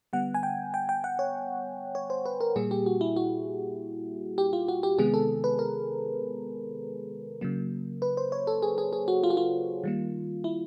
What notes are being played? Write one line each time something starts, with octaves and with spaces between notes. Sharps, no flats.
D3 G3 B3 F#5
G#5
G5
G5
G5
F#5
C#5
C#5
C5
B4
A#4
A#2 G3 A#3 G#4
G4
F#4
E4
F#4
G4
F4
F#4
G4
C3 D#3 G#3 B3 G#4
A4
B4
A#4
C#3 F#3 A#3
B4
C5
C#5
A4
G#4
G#4
G#4
F#4
F4
F#4
F4
D#3 G3 A#3
E4